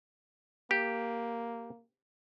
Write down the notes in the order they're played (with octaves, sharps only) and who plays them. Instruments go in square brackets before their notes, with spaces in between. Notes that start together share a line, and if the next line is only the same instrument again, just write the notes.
[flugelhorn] A#3 [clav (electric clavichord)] G4